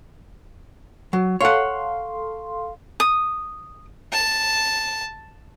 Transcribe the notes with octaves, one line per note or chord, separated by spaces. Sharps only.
F#3
A4 C#5 F5 F#5 C6
D#6
A5